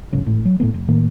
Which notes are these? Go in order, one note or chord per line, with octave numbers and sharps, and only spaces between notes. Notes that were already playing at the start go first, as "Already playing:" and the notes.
B1 G#2 C#3
G#1 A2
F#3
A2 D#3 A3 B3
F1
A2 D#3 A#3